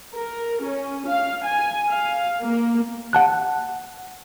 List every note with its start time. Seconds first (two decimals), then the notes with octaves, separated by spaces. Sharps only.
0.15 A#4
0.63 C#4
1.08 F5
1.45 G#5
1.89 F5
2.42 A#3
3.13 F#5 A5 F#6